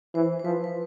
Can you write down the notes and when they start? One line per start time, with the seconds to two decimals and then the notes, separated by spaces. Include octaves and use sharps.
0.15 E3 C5
0.39 C5
0.45 F3 B4
0.64 B4